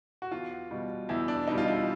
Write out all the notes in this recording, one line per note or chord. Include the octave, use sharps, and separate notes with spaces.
F#4
E2 F4
B2 G3
E2 E4
D4
B2 G3 D#4
F4
E4